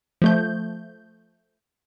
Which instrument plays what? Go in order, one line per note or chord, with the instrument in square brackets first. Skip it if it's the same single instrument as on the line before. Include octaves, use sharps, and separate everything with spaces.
[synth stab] F3 A3 G6